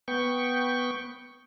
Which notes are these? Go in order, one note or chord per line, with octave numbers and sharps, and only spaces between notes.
B3 G5 C#6